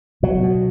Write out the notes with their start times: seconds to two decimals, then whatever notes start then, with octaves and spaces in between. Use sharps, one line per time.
0.23 B2 F#3
0.43 B2